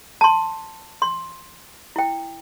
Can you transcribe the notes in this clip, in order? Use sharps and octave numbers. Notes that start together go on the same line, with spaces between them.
A5 C6
C6
E4 G5